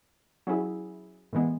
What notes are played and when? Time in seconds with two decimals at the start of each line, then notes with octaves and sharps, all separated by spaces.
0.47 F#3 C#4 E4 G#4
1.33 A2 E3 G#3 B3